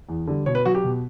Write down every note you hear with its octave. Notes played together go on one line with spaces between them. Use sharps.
E2
D3 G3
B2 C#5
B4
F#3 F#4
G4
B2